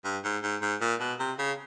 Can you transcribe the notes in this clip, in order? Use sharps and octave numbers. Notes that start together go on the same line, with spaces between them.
G2
G#2
G#2
G#2
A#2
B2
C3
C#3